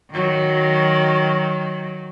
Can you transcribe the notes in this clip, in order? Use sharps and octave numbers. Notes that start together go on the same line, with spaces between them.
D#3 F#3